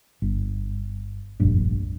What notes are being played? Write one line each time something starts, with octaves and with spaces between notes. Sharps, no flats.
G1
F1 A#1 G2